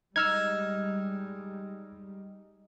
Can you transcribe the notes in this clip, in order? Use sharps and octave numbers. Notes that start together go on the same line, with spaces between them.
G3 G#3 D#4 E6 F6 G#6